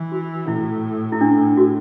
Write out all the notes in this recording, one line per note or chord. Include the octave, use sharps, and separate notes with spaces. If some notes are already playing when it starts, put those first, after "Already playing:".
Already playing: E3
F#4
A2 E4
E4
D4
F#4